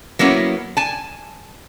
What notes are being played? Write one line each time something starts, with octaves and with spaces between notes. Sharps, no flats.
F#3 A#3 B3 C#4 E4
G#5 A5